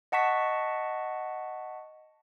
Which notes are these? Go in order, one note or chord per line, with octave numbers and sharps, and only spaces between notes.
D#5 F#5 A5 C#6 B6